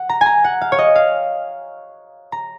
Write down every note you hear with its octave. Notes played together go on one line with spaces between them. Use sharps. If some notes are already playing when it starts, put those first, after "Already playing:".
Already playing: F#5
A#5
G#5 A#5
F#5
F5
C#5
D#5
F5
A#5